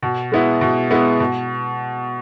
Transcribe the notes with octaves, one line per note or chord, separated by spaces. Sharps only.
B2
G#3 B3 E4
B2
G#3 B3 E4
B2